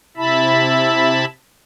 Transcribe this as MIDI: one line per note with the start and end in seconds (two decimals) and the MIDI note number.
0.17 1.25 48
0.17 1.25 64
0.17 1.25 76
0.17 1.25 81
0.17 1.25 83